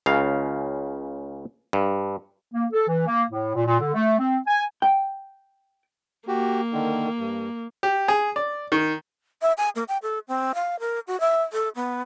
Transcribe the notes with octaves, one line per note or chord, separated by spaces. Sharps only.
C#2 C#3 F5
G2
A#3
A4
E3
A#3
A2
A#2
A#2
D3
A3
C4
G#5
G5
A#3 F#4 G4
D3 D#3
G2
G4
G#4
D5
D#3
E5
G#5
A#3
G5
A4
C4
F5
A#4
F#4
E5
A4
B3